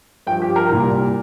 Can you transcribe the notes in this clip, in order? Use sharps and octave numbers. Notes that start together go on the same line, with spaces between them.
G2 F3 G5
G4
A#4
C2 A#2 G3